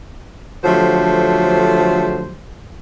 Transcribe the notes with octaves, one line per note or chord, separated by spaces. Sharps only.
D3 F3 F#3 A3 G4 C5